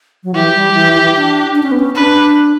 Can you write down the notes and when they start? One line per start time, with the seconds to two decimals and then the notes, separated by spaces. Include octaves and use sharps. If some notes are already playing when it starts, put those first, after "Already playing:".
0.24 F#3
0.34 E3 G4
0.55 G3
0.74 E3
0.95 E3
1.16 D4
1.55 D4
1.63 C#4
1.72 B3
1.79 C#4
1.95 D4 B4